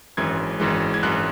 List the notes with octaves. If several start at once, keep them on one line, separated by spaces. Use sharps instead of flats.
G#1 F#2 E3 G#3 G#6
G#1 F#2 E3 G#3
G#6
G#1 F#2 E3 G#3 F#6